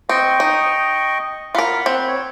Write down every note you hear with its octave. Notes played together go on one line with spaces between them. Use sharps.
C4 D#5 G5 C#6
D#4
F4 A#4 F#5 B5
C4
C#5